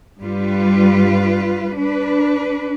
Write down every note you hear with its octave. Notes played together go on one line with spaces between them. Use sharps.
G2 G3 F4 B4
D4 B4